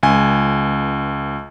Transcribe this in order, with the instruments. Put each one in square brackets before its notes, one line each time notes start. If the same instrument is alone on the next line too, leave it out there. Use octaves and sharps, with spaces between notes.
[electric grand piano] C#2 G#5